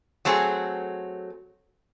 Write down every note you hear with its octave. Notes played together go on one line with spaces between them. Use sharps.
F#3 A3 C4 G#4